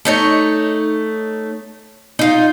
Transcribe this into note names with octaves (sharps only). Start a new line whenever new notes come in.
A3 D#4 C#5
D#4 F4